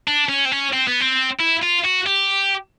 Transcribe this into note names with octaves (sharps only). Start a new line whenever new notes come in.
D4
C#4
C4
C#4
C4
B3
C4
E4
F4
F#4
G4